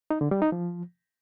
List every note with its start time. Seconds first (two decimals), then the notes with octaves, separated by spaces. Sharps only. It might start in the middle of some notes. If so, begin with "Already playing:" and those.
0.11 D#4
0.21 D3
0.31 G3
0.42 D#4
0.52 F3